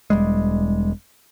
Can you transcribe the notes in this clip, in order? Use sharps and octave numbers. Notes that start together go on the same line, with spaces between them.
E1 G3 G#3